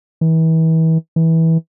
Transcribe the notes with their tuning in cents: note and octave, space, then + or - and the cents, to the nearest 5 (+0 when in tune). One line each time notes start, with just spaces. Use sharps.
E3 -35
E3 -20